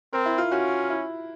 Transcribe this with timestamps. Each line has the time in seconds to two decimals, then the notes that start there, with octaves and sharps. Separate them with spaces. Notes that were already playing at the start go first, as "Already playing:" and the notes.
0.13 C4 A#4
0.26 E4
0.38 F4
0.52 C#4 F#4
0.90 E4